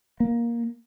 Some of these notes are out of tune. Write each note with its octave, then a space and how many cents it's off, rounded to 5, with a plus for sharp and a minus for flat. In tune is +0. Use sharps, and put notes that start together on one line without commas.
A#3 +10